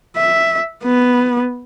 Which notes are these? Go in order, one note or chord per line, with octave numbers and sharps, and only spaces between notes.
E5
B3